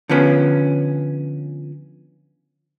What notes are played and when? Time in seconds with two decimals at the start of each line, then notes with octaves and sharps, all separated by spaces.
0.09 D3 F3 B3 C#4